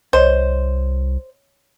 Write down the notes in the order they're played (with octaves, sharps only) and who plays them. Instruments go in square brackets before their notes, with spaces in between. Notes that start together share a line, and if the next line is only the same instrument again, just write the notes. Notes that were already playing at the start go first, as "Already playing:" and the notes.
[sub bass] C2 [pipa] C5 [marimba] C#5 D#5